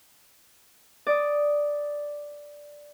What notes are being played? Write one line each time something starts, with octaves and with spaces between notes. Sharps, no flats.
D5 D#6